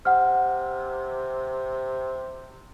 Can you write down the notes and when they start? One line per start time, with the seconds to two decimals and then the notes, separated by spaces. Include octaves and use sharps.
0.05 C3 F#5 F6